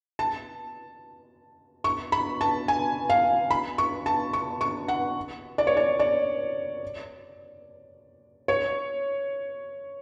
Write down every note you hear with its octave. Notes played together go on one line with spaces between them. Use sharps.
A5
C#6
B5
A5
G#5
F5
B5
C#6
A5
C#6
C#6
F#5
D5
C#5
D5
D5
C#5